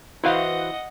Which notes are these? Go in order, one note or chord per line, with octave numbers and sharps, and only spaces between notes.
E3 E4 F#4 B4 C5 D#5 F5 F#5